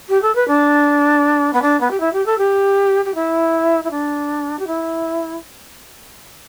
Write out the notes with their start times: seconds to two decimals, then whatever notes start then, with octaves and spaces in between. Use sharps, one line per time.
0.09 G4
0.22 A4
0.35 B4
0.48 D4
1.53 B3
1.62 D4
1.81 B3
1.91 G4
2.00 E4
2.13 G4
2.26 A4
2.38 G4
3.05 G4
3.15 E4
3.84 E4
3.91 D4
4.59 G4
4.67 E4